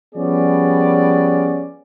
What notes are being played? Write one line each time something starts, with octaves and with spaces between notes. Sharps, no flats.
F3 G3 B3 C#4 G#4 D5